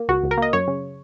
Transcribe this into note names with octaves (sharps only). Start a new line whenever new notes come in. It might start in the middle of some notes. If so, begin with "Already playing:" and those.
Already playing: A#3
C#2 F#4
C#2
A#4
A#3 D#5
F#2 C#5
C#3